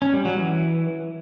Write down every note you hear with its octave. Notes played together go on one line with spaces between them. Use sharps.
C#4
G3
F#3
E3